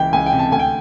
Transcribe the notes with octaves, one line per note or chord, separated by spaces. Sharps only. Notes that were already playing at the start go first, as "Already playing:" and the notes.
Already playing: C#2 E3 G5
C#2 G#5
G5
C3
A5
D2 G#5
G5